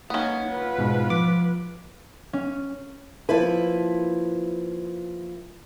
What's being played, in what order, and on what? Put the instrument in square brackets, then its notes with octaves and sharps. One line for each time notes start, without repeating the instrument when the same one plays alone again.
[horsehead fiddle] A#3 D#4 [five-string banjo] B3 C#4
[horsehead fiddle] F4 B4
[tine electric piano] G#2 B2
[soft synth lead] F3 [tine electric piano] D6
[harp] C#4
[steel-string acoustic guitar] F3 A#3 E4 B4